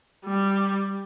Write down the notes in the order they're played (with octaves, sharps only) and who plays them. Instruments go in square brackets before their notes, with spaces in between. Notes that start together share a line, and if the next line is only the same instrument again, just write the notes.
[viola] G3